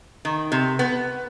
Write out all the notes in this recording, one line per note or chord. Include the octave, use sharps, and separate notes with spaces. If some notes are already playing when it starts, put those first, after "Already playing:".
D#3
C3
B3